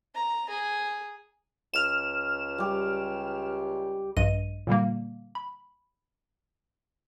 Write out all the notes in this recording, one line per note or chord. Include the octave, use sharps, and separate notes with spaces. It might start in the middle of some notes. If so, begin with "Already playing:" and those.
A#5
G#4
C#2 F6 E7
G3 G4
A#1 G2 D#5 D#7
A#2 D3 G3 A#3
B5